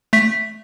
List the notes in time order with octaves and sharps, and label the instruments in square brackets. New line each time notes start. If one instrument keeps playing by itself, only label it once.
[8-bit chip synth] A3 [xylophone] B6